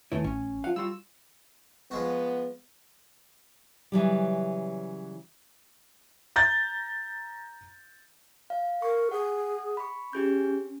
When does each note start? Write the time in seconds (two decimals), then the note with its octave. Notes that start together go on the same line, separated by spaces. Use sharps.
0.12 D#2 E3 A3 C#4 E4
0.24 A1 C#4
0.64 F3 F5 F#5
0.76 G3 F4 F#4 E6
1.91 F3 G#3 B3 F#4
3.92 C#3 E3 F#3 G3
6.36 A#5 G6 A6
8.50 F5
8.82 A#4 C#6
9.11 G#4 F#5
9.77 B5 C#6
10.13 C#4 G4 G#4 G6